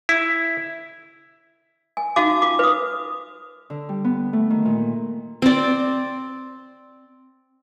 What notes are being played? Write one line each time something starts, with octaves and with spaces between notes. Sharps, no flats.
E4
G#5
C#4 D#4 F#4 F5 A5 D6
F4 D6
B4 D#6
D3
G3
B3
A3
D#3
A#2
C4 D5